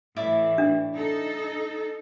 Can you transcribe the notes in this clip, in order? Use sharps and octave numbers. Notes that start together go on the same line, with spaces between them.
A2 E3 E4 D5 E5
D4
D#4 A4